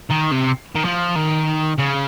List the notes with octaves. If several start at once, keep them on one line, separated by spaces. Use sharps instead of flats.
D#3
C3
D#3
F3
D#3
C#3